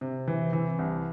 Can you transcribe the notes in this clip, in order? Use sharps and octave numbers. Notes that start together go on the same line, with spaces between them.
C3
E3
E3
C2